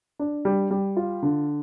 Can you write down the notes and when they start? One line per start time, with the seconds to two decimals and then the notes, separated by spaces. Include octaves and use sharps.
0.19 D4
0.45 G3
0.71 G3
0.97 F4
1.22 D3